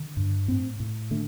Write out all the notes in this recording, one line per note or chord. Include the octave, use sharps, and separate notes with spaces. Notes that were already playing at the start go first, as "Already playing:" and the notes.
Already playing: D3
G2
A2 C4
A2
D3 A3